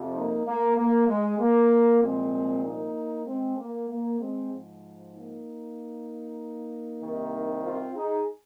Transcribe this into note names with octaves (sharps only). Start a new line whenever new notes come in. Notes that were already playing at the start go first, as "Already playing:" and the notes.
Already playing: F2 C3 F3
A#3 D#4
A#3
A#3
G#3
A#3
C2 A#2 F3 G#3 C4
A#3 D#4
G#3 C4
A#3
A#3
G#3 C4
G#2 F3
A#3 D#4
C2 C3 D#3
C4 F4
D#4 G#4